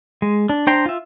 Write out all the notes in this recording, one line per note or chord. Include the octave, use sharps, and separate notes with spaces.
G#3
D4
D4 C5 G5 A#5 C6
F4 E5